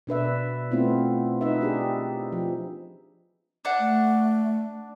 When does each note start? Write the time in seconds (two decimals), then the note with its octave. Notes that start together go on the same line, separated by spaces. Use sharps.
0.07 B2 D4 B4 E5
0.71 A3 B3 C4 E4 F4
1.41 D#4 B4 E5
1.61 D4 G4 G#4
2.32 F3
3.65 D4 F#5
3.79 A3